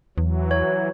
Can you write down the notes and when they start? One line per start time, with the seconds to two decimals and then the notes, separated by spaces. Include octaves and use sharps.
0.18 E2 E3 F#3
0.51 C#5